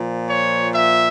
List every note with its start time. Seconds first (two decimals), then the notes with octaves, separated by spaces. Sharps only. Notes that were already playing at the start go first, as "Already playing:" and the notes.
Already playing: A#2 F3
0.28 C#5
0.74 E5